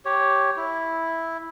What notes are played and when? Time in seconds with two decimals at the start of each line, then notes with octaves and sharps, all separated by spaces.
0.05 G4 C#5
0.57 E4